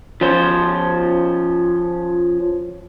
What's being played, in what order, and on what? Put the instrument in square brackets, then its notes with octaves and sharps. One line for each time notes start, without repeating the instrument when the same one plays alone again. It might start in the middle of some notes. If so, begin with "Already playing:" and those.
[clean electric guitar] F3 C#4 C5